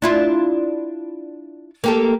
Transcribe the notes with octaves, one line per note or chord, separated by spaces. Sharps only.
D4 E4 F4
A#3 G4 A4